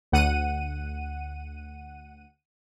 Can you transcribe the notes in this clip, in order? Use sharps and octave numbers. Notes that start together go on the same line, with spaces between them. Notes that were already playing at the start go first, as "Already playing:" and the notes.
D2 F#5 D#7